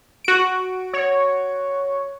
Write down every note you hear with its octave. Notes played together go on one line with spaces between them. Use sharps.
F#4 D7
C#5